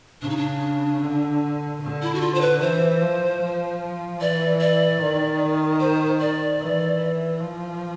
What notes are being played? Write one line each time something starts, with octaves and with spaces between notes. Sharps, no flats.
C#3 D4
D#4
D4
D3
D3
E4
F#4
F4
C5
B4
E3 C5
F3
F3
E3 D5
D5
D#3
C5
D5
E3
F3